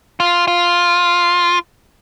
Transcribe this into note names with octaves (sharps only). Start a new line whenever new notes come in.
F4
F4